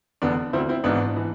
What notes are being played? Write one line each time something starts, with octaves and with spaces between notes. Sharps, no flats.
F1 E2 D3 B3 D4
D2 D3 C4 E4
C4 E4
G#1 G#2 E3 B3 D4
E3